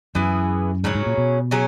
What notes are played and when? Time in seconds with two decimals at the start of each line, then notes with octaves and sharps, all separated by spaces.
0.15 F#2 E3 B3 E4 G#4
0.84 G#2 C#3 F#3 C#4
0.95 G#2
1.06 A#2
1.18 B2
1.51 F#3 C#4 G#4